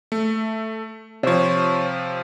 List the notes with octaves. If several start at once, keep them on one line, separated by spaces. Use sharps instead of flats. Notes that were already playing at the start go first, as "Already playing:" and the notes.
A3
C3 F3 C5 C#5